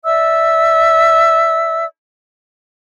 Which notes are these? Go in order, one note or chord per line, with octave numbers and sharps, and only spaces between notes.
D5 E5 E6